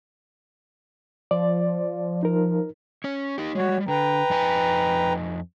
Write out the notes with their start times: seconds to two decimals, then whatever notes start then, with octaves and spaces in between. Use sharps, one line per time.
1.31 F3 D5
2.23 D#4 A#4
3.04 C#4 C#5
3.38 D#4 G4
3.55 G3 G#3 F#4 C#5
3.88 D3 B4 G5 A#5
4.30 F2 D#4 G#5